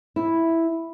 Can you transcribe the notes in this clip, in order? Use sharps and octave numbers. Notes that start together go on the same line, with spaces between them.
E4